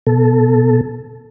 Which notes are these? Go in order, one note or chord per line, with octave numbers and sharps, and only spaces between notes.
B2 A4